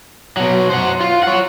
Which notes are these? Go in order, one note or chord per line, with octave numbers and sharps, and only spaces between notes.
B2 F#3
C5 F#5
F4
C#5 F#5